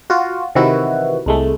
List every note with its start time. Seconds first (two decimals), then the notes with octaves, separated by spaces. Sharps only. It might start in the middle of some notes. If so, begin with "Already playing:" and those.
0.10 F4 F#4
0.55 C3 D#3 E3 E4 F#4 B4
1.26 C2 G#3 A3